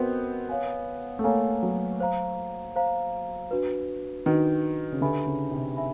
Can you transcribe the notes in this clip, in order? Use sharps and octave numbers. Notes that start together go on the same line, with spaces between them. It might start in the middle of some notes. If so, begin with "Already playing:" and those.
Already playing: B3 C4 F#4 A#4 D#5 G5
C#5 F5 G#5
A3
A#3 C#5 F5 G#5
F#3
C5 F5 A#5
C5 F5 A#5
D4 F#4 B4
D#3 D4 F#4 B4
C#3
D3 G4 B4 E5 G#5 B5
C#3
C3
E5 G#5 B5